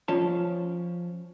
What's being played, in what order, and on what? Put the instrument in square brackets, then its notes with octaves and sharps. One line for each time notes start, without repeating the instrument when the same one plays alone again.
[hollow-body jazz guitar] F3 C#4 A5